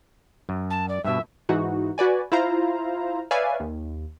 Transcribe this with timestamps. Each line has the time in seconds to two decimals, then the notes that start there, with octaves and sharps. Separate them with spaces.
0.49 F#2
0.70 A5
0.89 D5
1.04 G2 B2 E5
1.49 G#2 E3 D#4 F#4
1.98 F#4 B4 D5 G#5
2.32 E4 F4 C5 F5 A#5
3.31 B4 C#5 D5 E5 F5 G#5
3.60 D#2